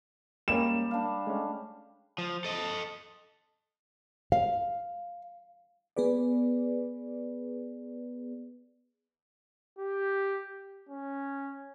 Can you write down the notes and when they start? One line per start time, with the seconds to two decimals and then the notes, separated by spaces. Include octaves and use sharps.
0.48 G3 G#3 A#3 C#4 E7
0.91 D4 F5
1.27 G#3 A3 C#4
2.18 F3
2.44 A4 D#5
4.32 F5
5.97 B3 G#4 B4 D5
9.79 G4
10.89 C#4